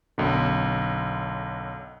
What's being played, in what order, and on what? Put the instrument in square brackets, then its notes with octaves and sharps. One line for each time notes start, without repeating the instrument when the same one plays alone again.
[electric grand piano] B1 F#2 D3